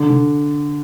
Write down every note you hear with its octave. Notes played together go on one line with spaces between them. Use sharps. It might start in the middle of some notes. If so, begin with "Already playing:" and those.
Already playing: D3
D3